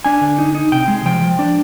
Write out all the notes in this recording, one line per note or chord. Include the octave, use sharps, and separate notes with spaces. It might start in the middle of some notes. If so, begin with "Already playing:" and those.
D4 G#5
D3
D#4
D#4
C3 G5
G#3
F3 G5
F3
D4